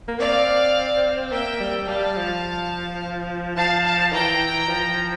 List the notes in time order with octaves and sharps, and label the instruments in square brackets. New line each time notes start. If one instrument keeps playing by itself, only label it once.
[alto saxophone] A#3
[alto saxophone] C4 [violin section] D5 F5
[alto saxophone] A#3 [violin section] E5 G5
[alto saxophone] G3
[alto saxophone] G3 [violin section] F5 A5
[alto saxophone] F3
[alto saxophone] F3 [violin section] F5 A5
[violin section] F5 A5
[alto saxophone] E3 [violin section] G5 A#5
[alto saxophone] F3